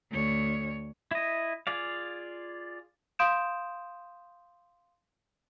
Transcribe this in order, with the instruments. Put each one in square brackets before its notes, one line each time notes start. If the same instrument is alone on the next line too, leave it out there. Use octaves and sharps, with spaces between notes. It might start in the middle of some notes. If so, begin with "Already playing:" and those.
[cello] D2 C#5
[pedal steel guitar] E4 D#5
F4 G#4 D5 F5
[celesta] F5 C6 D#6 G6 D7 E7